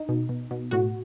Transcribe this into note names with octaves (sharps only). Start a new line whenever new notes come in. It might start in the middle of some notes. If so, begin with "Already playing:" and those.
Already playing: D#4
B2
B2
B2
A2 F#4